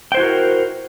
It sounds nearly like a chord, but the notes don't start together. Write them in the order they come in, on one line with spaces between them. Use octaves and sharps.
G5 C5 E4 F#4 A#4